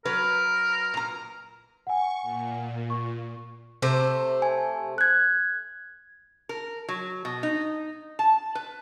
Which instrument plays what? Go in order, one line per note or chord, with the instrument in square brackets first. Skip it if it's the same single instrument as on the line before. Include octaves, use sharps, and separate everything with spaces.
[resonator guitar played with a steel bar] F#3 B4 [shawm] A#4
[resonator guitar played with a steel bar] A#2 A#5
[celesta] F#5 G#5 [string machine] C#6
[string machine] A#2
[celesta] C#6
[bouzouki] C3 A3 C5
[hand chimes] G#5
F#6 G#6
[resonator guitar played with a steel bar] A#4
F#3
B2
D#4
A5
B4